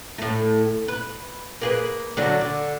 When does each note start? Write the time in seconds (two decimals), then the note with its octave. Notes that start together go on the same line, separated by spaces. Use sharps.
0.18 A2 A3
0.88 B4
1.61 A#3 G#4 B4
2.17 D3 F#3 D4
2.41 D3